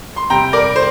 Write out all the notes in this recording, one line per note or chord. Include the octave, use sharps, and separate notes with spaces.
C6
C3 G3 G5 A#5
A#4 D5
C5